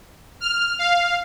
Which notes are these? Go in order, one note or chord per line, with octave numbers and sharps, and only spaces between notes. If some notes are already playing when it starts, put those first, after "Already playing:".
F6
F5